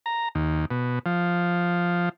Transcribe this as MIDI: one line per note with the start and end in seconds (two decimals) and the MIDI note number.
0.06 0.29 82
0.35 0.65 39
0.71 0.99 47
1.06 2.09 53